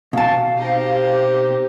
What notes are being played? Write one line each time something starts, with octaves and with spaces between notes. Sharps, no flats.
B2 F5 A5
C4 D#4 G4